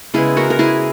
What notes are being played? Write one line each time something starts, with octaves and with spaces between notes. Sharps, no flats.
C#3 G#3 B3 E4 G#4
F#4 A#4
A#4
E4 G#4